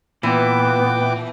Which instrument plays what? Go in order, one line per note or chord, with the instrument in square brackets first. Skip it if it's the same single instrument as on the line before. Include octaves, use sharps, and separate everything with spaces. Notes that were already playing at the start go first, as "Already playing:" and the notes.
[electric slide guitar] A#2 [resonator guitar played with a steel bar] E3 [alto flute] B3 [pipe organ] G5 D6